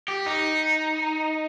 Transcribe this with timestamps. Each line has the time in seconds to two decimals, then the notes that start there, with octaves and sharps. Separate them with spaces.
0.08 G4
0.26 D#4